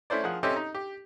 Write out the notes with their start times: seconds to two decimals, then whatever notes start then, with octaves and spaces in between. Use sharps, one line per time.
0.10 A3 C#4 E4 C5 D5
0.24 F3 G#4 A#4 F#5 F#6
0.43 C4 C#4 G4 A4 D#5 E5
0.56 D#4
0.75 G4